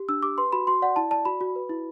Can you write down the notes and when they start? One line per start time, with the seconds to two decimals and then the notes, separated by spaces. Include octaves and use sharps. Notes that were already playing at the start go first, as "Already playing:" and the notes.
Already playing: G4
0.09 D4 E6
0.23 G4 D6
0.38 B4 C6
0.52 F#4 B5
0.67 F#4 C6
0.82 D5 F#5
0.96 E4 A5
1.11 D5 A5
1.25 F#4 B5
1.41 F#4
1.56 B4
1.70 E4